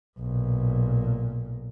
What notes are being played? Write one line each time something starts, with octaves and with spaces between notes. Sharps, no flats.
B1 A#2